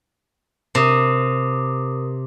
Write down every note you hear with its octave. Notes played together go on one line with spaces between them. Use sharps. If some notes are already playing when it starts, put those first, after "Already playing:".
C3 A#4 D#6